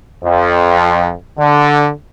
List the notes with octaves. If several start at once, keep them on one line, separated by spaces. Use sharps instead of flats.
F2
D3